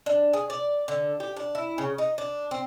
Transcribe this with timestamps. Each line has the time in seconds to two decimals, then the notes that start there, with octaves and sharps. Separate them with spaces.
0.06 D4
0.33 G#4
0.50 D5
0.88 D3
1.20 G4
1.37 D4
1.55 E4
1.78 C#3
1.98 D#4
2.18 D4
2.51 C4